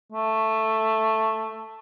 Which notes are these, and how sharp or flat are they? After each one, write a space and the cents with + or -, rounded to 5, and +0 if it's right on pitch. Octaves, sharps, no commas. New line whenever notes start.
A3 +5